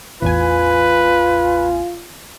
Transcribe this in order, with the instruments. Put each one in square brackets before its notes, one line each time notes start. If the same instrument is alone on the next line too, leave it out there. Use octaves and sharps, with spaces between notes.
[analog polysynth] A1 E2 G#5 [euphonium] F4 [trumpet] B4